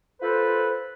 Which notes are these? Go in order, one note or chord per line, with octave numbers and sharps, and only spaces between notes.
F4 A4 B4 C5